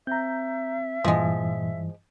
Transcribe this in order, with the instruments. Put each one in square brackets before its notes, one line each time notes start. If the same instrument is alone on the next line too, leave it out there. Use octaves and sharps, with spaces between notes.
[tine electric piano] C4 [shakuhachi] E5 [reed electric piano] A#5 G6
[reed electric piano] G2 E3 [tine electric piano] A#2 [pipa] F3 G#3